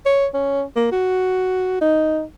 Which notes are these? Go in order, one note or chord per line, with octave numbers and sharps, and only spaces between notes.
C#5
C#4
A#3
F#4
D#4